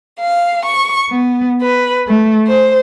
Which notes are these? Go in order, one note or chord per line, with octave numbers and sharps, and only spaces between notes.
F5
C#6
B3
B4
A3
C5